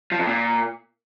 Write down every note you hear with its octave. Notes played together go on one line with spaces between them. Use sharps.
F3
F2
A#2